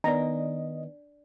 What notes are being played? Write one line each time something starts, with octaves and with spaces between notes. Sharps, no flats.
D#3 B3 D4 D5 D#5 A#5